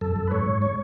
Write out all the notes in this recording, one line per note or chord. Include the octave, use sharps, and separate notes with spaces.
F#2 A4
F#2
B4
G#2 C#5
G#2
C#5